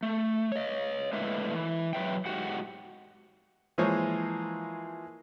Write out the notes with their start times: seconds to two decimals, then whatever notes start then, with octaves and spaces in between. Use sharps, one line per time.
0.03 A3
0.52 C#5 D#5
1.13 A2 D3 G#3 A#3 B4 E5
1.54 E3
1.93 F#3 B4 E5 G5
2.26 G#2 F#4 G4 F#5
3.78 E3 F3 G#3 A#3 C5 C#5